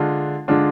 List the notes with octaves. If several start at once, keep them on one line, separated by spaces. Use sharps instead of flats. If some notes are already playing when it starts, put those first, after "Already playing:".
Already playing: D3 G#3 D4 F4
D3 G#3 D4 F4